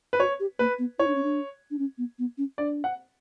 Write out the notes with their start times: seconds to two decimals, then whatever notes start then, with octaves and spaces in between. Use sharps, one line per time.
0.13 B4
0.19 F#4 C#5
0.40 G4
0.59 A#3 B4
0.79 B3
0.99 E4 C#5
1.07 D4
1.15 C#4
1.23 D4
1.71 D4
1.79 C#4
1.98 B3
2.19 B3
2.38 C#4
2.58 D4 D5
2.84 F#5